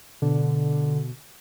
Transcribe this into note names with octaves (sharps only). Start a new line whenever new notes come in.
B2 D3